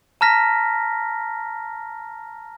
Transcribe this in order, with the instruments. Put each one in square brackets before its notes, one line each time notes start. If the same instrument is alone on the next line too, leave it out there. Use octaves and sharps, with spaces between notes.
[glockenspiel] A5 A#5 F6 A#6 B6